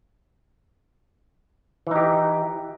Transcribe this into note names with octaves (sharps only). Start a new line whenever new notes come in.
E3 D#4 G4